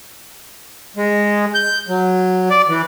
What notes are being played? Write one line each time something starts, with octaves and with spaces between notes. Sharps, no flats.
G#3
G6
F#3
D5
E3